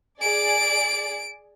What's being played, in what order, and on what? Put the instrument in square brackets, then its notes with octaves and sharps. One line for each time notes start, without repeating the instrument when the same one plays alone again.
[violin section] G#4 D5 [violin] D7